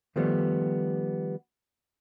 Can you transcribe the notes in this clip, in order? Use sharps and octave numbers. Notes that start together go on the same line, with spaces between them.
D#3 F3 G3 A3 B3